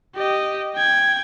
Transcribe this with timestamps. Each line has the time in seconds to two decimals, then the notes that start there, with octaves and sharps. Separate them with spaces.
0.15 G4 D#5
0.76 G5 G#6